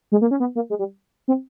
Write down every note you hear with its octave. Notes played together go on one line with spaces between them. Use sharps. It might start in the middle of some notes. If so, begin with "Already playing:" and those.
G#3
A#3
C#4
B3
A#3
G#3
G3
C4